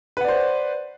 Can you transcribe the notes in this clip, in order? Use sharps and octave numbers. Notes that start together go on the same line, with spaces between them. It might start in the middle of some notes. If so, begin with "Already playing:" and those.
B4 C5 D5 F#5